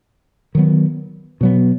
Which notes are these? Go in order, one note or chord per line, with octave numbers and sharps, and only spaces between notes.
D#3 F#3 B3
B2 F#3 B3